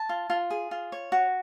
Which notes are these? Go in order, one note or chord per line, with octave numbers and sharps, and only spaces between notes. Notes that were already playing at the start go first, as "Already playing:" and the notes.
Already playing: A5
F4
F4
G#4
F4
C#5
F#4